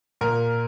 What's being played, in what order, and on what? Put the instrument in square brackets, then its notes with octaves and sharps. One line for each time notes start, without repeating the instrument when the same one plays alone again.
[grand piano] A#2 A#4